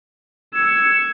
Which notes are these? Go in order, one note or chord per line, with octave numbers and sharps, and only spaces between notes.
E6 G#6 C#7